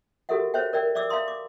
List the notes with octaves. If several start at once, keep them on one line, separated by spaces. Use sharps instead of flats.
F#4 G4 A4 A#4 E5 F#5
C5 C#5 E5 G5
A#4 D5 E5 G5
D5 E5 D6 E6
E5 F5 A#5 C6 D#6
D6